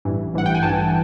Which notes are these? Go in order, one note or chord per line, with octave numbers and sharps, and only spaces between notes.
A1 G2 E3
A1 G2 E3 F#5
G5
G#5
A1 G2 E3 A5